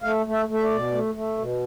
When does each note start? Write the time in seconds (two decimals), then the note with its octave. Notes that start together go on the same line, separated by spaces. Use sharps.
0.03 A3 F5
0.26 A3
0.33 E5
0.48 A3
0.54 E5
0.63 D5
0.71 B2
0.92 A3
1.14 A3
1.38 B2